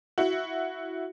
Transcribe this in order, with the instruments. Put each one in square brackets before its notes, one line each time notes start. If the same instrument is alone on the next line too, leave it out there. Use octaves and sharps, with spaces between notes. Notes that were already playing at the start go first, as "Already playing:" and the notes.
[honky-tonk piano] E4 F#4